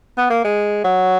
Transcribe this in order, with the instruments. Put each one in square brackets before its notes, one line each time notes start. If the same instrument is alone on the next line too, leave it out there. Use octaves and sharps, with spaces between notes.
[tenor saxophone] B3
A#3
G#3
F#3